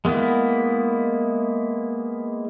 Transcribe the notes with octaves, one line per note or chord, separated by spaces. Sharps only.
G#3 A#3 B3 E4